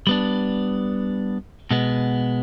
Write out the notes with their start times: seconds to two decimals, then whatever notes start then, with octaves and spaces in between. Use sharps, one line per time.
0.07 G3 B3 D4
1.71 B2 G#3 B3